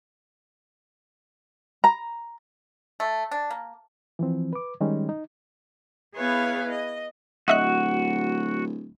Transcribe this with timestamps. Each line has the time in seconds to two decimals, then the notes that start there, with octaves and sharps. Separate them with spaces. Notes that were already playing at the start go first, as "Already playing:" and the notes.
1.84 A#5
3.00 A3
3.31 D4
3.51 A#3
4.19 E3 F3 C4
4.53 B4 D6
4.81 D#3 G3 G#3 C#4 D#4
5.09 D#4
6.15 B3 E4 G#4 B4 C#5 F5
6.71 D#5
7.48 D1 F#4 D#5 E5 F#6